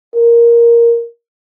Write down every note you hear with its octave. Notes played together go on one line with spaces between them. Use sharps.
A#4